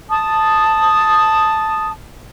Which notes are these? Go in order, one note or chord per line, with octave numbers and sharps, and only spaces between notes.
A5 D#6